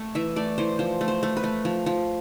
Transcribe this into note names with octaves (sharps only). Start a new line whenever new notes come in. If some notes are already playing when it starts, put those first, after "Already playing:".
Already playing: A3
E3 E5
A3 D5
E3 C5
F3 C5
A3
C5
A3
B4
A3
F3
F3